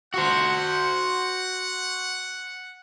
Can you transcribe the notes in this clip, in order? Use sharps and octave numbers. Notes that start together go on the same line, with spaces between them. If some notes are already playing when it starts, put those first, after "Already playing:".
F#4 C5 F#5